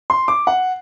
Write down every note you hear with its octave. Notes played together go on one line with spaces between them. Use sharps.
C6
D6
F#5